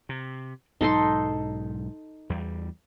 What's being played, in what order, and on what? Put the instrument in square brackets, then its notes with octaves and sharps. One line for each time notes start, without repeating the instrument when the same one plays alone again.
[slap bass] C3
[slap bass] B1 G#2 F#3 [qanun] D#4 A4 C6
[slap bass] E2 G3